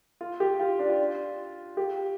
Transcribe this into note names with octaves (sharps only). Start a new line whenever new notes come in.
F4
G4
F4
D4
F4
G4